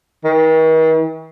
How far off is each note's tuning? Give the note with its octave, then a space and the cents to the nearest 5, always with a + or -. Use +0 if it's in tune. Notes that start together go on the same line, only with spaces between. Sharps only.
D#3 +45